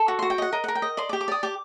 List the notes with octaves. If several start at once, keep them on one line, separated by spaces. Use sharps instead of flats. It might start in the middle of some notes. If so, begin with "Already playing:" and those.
Already playing: A4
F#4
F#4 C6
G5
D#5 F#5
A#4 D#5
A#4 F#5
G5
D#5
D5 C6
D6
G4
D6
D5 D#6
G4 D6